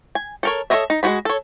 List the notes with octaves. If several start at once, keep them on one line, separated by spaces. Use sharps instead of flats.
G#5
A4 A#4 C#5
A4 C5 C#5 D#5 E5
D#4
G#3 A#3 F#4 G#4 B5
A4 C#5